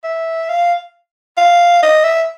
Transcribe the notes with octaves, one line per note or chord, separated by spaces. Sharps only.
E5
F5
F5
D#5
E5